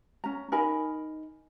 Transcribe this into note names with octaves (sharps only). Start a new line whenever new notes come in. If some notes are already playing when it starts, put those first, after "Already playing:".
C#4 A#5
D#4 A#4 G#5 B5